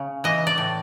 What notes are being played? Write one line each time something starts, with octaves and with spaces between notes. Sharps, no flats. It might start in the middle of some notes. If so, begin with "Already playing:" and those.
Already playing: C#3
E3 D#5
D5
A2